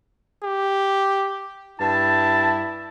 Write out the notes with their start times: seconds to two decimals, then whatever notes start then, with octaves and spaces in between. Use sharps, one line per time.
0.44 G4
1.80 G2 E4 A5